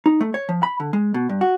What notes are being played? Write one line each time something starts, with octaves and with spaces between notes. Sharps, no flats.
D#4
A3
C#5
F3
B5
D3
G#3
B2
G2
F#4